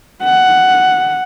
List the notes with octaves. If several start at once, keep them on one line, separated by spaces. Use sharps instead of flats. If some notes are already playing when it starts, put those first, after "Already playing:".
F#5